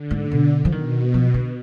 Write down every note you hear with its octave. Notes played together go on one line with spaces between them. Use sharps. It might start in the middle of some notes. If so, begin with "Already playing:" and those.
Already playing: D3
G#2
B2
F3
B2 D#3
F3
D3